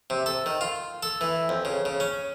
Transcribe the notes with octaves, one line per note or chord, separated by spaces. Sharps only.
C3
A4
D#3
F4
A4
E3
F2
C#3
C#3
C#4